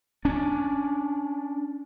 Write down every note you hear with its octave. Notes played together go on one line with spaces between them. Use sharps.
C#4 D4